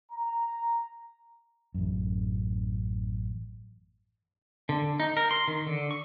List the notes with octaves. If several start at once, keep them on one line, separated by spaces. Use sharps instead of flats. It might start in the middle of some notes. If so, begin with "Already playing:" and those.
A#5
A1 F#2
D3
D#4
A#4
C6
D#3
D3
C#6